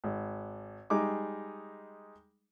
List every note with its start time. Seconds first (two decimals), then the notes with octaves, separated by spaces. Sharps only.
0.04 G#1
0.90 G3 G#3 D#4 G#4 D6